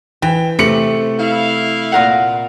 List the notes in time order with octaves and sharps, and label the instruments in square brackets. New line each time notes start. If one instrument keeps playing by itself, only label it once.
[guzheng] E3 [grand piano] G5
[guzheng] C3 [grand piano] A3 C#7 F#7
[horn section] E4 F5
[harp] A#2 A#4 F#5